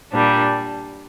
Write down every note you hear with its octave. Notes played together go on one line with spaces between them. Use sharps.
A#2 G3 D4